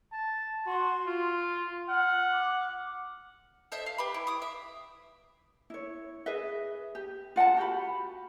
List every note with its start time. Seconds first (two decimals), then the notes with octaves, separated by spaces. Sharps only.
0.12 A5
0.66 F#4 C6
1.06 F4
1.89 F#5 F6
2.32 D6
3.72 A4 C5 D#5 E5
3.86 F5
3.98 G4 B4 B5
4.14 E4
4.27 D6 D#6
4.42 E5
5.70 E4 C#5
6.26 G#4 B4 D#5 E5
6.95 G4
7.36 F4 F#5 G5 A5
7.57 F#4 G4 G5 B5